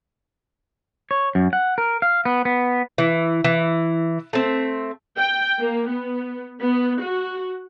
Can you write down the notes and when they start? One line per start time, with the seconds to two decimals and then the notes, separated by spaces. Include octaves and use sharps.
1.11 C#5
1.35 F#2
1.53 F#5
1.78 A#4
2.02 F5
2.25 B3
2.45 B3
2.98 E3
3.44 E3
4.33 A3 C4
5.18 G5
5.59 A#3
5.89 B3
6.60 B3
7.04 F#4